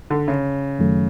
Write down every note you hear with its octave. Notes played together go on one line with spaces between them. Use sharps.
D3
C#3
F#2 D#3 F#3 A3